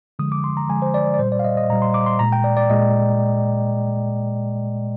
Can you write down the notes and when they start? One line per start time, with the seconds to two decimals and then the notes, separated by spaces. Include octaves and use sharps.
0.19 D3 F3 G#3 D#6
0.32 D6
0.44 C6
0.57 A#5
0.69 D3 F3 G#3 G#5
0.82 C5
0.94 D5
1.14 D5
1.19 A#2 G3 C5
1.32 D5
1.39 F5
1.44 D#5
1.57 D#5
1.69 A#2 G3 A#5
1.82 C6
1.94 D6
2.06 C6
2.19 A#2 G#3 A#5
2.32 G5
2.44 D5
2.57 D5
2.70 A#2 G#3 D#5